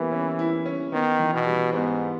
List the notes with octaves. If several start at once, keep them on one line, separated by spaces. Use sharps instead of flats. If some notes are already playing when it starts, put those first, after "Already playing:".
Already playing: E3 G3 A#3 B3
C#4
E4
C#4
D#3 B3
E3
B2
G3
G#2 B3